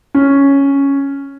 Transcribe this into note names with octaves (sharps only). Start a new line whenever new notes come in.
C#4